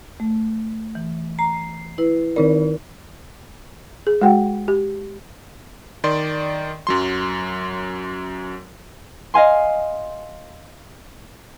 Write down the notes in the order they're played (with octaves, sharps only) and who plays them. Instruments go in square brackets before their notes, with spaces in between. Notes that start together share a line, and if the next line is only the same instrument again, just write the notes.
[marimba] A3
E3
[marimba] A#5 [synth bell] C7
[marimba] E4 B4
[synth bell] D#3 D#4 D5 [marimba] A#4
[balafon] G#4
G#3 F#4 F#5 G5
G4
[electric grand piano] D#3 D5 C6
F#2 F#3 C6
[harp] D#5 F5 G#5 C6